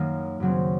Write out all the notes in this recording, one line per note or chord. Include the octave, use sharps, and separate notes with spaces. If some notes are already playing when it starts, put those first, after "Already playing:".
Already playing: F#2 D#3 F#3 A#3 D#4
F#2 C#3 F#3 C4 F#4